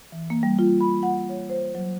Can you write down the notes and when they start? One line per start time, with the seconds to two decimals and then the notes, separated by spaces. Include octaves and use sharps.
0.12 E3
0.30 A#3
0.43 G3
0.59 F4
0.81 B5
1.03 F#5
1.29 C#5
1.50 C5
1.75 F#3